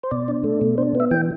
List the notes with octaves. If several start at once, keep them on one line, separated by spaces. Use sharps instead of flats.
C5
B2 D5
D4
A3
B2
D4 C5
B3 E5
E3 G5